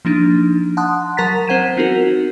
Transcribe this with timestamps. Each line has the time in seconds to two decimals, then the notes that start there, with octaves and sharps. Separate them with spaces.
0.05 F3 A#3 D4 D#4
0.77 F#5 A5 C6 D#6 F#6
1.17 F#3 A#4 F#5 A#5 A6 B6
1.47 C4 C5 F#5 G#6 D#7 E7
1.77 B3 C4 D#4 F4 F#4 A#4